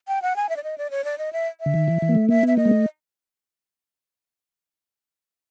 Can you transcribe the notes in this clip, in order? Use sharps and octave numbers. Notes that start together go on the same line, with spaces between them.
G5
F#5
G#5
E5
D5
D#5
D5
C#5
D5
D#5
E5
E5
D3
D#3
E3
E3
A#3
A3
A#3 E5
B3 E5
A#3 D#5
G#3
A3